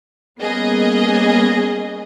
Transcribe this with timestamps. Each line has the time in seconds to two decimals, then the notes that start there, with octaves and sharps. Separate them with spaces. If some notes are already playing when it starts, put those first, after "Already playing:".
0.41 G3 A#3 B3 C#4 G#4 D#5